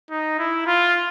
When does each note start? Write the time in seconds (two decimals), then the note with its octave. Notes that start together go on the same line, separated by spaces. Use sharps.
0.10 D#4
0.39 E4
0.67 F4